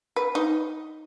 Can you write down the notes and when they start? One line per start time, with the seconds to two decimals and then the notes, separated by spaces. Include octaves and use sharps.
0.16 B4
0.35 D#4